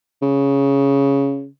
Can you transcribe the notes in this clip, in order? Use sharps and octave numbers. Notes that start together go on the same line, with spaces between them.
C#3